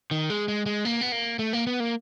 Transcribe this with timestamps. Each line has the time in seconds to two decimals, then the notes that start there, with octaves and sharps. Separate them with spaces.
0.11 D#3
0.30 G#3
0.48 G#3
0.66 G#3
0.85 A#3
1.01 B3
1.12 A#3
1.39 A3
1.53 A#3
1.67 B3
1.80 A#3